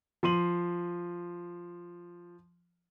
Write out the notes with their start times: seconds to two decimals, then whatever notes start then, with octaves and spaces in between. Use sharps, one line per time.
0.23 F3 C6 D#7 F#7